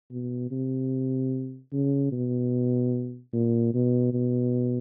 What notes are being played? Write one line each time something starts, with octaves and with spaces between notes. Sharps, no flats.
B2
C3
C#3
B2
A#2
B2
B2